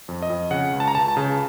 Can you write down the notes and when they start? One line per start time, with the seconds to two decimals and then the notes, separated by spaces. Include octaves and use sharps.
0.08 F2
0.22 D#5
0.30 F2
0.51 C#3 F#5
0.73 C#2
0.80 A5
0.88 A#5
0.95 C#2 A5
1.08 A5
1.17 C#3